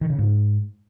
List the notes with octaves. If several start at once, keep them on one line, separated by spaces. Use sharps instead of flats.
D#3
C#3
G#2